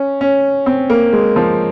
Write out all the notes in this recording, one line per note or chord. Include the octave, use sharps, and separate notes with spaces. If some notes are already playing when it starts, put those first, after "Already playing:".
Already playing: C#4
C#4
C4
A#3
G#3
F3